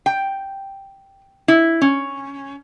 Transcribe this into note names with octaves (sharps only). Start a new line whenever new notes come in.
G5
E4
C#4